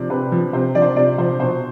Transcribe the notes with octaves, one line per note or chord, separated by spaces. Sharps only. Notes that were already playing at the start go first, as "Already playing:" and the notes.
Already playing: C3 F3 C5 D5
C3 B4
F3
C3 C5
F3 D5
C5
C3 D5
F3 C5
B2 C5